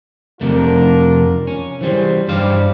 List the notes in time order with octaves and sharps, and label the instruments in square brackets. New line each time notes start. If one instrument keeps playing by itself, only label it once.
[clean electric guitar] F2 C3 A3 [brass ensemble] D4 F4 A#4
[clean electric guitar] C#4
[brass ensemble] C#3 C5 [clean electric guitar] E3 G3
[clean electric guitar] G2 C5 F5 [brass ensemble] G3